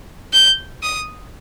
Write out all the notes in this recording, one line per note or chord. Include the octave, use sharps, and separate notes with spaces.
G6
D#6